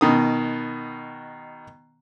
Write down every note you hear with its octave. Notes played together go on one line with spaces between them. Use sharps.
B2 D#3 D#6